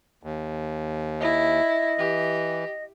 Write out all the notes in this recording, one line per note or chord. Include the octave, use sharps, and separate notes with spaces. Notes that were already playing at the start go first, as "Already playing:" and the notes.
D#2
E4 D#5
E3 G4